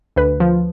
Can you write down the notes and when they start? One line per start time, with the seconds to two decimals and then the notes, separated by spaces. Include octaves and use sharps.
0.16 D2 B4
0.40 F3